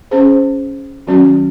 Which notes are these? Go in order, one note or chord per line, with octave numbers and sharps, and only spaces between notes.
C#4 G#4 C5
D#3 F#3 C#4 F#4